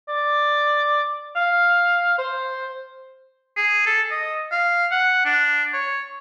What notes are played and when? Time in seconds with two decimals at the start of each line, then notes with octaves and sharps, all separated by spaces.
0.09 D5
1.36 F5
2.18 C5
3.57 G#4
3.86 A4
4.11 D#5
4.51 F5
4.91 F#5
5.25 D4
5.73 C#5